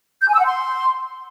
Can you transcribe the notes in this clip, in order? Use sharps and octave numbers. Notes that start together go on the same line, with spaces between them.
G6
G#5
E6
F#5
C6